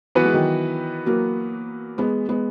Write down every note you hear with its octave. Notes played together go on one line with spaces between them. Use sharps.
E3 F#3 B3 F#4 B4
G#3
D#3 F#3
F#3 A#3
G#3 B3
G#3 B3